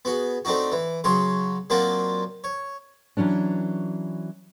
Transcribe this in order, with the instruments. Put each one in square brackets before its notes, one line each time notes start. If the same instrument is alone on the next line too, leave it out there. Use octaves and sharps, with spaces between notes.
[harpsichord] B3 F#4 G#4
A3 C4 D4 D#4 F#4
E3
C#3 F#3 G#4 C#5 C6
F#3 A#3 C4 D4 F4 F#4
C#5
[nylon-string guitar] E3 F#3 C#4 D4